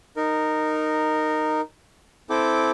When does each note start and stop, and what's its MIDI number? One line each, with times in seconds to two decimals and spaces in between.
0.17 1.61 63
0.17 1.61 70
2.30 2.71 60
2.30 2.71 64
2.30 2.71 69
2.30 2.71 79
2.30 2.71 86